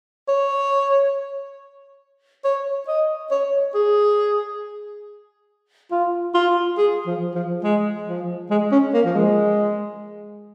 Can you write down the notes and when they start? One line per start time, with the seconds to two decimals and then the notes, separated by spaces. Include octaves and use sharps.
0.28 C#5
2.45 C#5
2.88 D#5
3.31 C#5
3.75 G#4
5.91 F4
6.35 F4
6.78 G#4
7.07 F3
7.35 F3
7.64 G#3
8.08 F3
8.50 G#3
8.72 C#4
8.94 A#3
9.06 F3
9.16 G#3